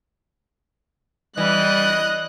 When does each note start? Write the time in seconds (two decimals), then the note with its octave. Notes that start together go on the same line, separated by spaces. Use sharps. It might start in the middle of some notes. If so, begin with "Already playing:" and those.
1.37 E3 G3 D#5 F#6